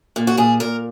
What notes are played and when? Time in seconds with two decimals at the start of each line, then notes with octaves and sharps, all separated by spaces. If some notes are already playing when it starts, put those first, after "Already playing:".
0.16 A#2
0.27 F#4
0.37 A#2 G#4
0.60 A#2 A#4